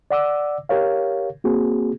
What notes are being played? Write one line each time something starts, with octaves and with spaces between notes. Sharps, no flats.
D5 F#5 D6 E6
G4 A#4 C#5 F5
A#3 C4 F#4 G#4